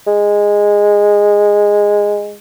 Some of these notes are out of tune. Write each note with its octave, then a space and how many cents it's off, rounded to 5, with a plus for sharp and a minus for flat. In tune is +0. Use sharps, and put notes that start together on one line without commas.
G#3 -10